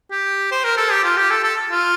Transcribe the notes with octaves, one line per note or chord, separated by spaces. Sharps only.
G4
C5
A#4
A4
G4
F4
G4
A4
A4
F4